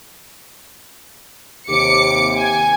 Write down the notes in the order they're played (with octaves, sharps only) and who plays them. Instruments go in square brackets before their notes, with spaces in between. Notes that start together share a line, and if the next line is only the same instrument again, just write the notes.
[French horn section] D#2 C3 G4 [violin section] D6 C#7
[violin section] G#5